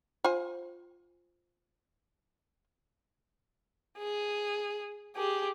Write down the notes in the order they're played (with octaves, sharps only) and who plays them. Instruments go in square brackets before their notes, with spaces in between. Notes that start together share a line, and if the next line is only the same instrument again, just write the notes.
[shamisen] F4 C5 G#5
[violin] G#4
G4 G#4